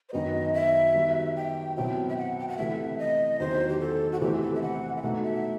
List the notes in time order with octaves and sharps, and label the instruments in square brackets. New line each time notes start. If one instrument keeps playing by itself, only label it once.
[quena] C5
[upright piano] F#2 D#3 F#3 B3 [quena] D#5
[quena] E5
[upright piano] D#3 G3 B3 F#4
[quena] G5
[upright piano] B2 F#3 C4 E4 [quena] G5
[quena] E5
F#5
G5
F#5
[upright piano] C3 E3 A3 [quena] E5
[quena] D#5
[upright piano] E2 D#3 F#3 [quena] C5
[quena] G4
A4
F#4
[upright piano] C3 E3 A3 C4 E4 [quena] G4
[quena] A4
E5
F#5
E5
[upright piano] B2 A3 D#4 F#4 [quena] F#5
[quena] E5